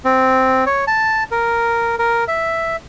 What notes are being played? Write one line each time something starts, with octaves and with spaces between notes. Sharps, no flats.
C4
C#5
A5
A#4
A#4
E5